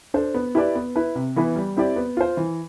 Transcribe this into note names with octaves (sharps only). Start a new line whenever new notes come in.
D4 A4 C5
B3
E4 G4 B4 D5
B3
E4 B4
C3
E3 B3 E4 B4
G3
C4 E4 G4 D5
B3
F4 C5
E3